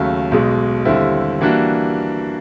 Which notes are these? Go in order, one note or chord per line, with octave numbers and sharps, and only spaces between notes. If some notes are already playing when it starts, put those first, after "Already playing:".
Already playing: D#2 C#3 F#3 A3
B1 B2 G#3
D#2 D3 G3 C4 E4
E3 G3 A#3 D4 F#4